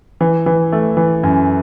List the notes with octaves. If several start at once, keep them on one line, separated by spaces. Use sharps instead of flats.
E3
E3
A3
E3
F#2